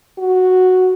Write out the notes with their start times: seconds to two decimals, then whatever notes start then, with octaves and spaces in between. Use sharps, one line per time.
0.18 F#4